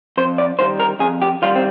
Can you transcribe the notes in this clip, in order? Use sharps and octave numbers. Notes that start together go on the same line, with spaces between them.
F2 C5
D5
D#3 G3 C5
A#4
F2 G#4
G4
D#3 G3 F4
C4